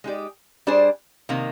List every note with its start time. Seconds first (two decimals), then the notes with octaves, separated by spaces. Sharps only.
0.04 G#3 D#4 G4 D5
0.67 G3 D4 G#4 C5
1.29 C3 D#3 A#3